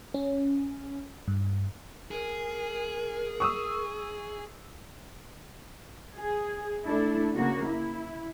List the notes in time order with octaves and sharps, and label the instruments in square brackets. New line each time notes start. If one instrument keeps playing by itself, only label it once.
[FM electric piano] C#4
G2
[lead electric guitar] G#4 [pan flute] A#4
[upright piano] C#6 D#6 E6
[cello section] G#4
A3 D4 E4 A4
C#3 A#3 F#4
E4